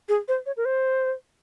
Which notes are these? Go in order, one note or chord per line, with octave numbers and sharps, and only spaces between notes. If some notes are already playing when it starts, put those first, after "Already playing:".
G#4
C5
C#5
A#4
C5